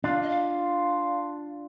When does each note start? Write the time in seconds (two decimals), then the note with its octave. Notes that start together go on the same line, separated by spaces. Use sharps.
0.04 D4 F4 F5
0.22 D#5
0.30 F5